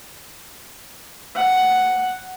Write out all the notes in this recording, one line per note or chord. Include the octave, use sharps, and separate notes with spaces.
F#5